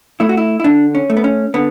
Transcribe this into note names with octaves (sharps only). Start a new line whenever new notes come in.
A3 E4
F#4
E4
E4
D3 D4
C#4
A3
B3
C#4
D3 B3